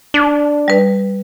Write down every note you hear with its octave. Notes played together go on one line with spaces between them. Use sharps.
D4
G3 B4